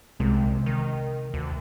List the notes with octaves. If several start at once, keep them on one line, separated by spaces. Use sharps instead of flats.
C2 C3 G#3
D#3
D2